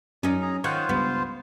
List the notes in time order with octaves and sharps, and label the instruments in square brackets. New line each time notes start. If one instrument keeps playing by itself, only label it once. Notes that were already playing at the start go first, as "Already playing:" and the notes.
[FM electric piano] F#2 [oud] C#4 D#4 [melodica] D5
[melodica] G#4 A#5
[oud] D#3 [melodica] F4 C5 [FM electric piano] C#5 F#5
[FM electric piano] C#2 G2 [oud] B3